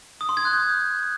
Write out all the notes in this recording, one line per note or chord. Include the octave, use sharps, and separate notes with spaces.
D#6
C6
G#6
F#6
G6